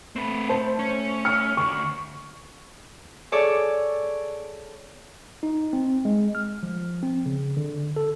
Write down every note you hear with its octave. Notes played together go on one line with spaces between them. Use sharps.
A3 C4 B4
C5 A5
C#4
F6 C#7
D2 C#6
G#4 A4 C#5 D5
D#4
C4
G#3
F6
F3
C4
C#3
D3
A4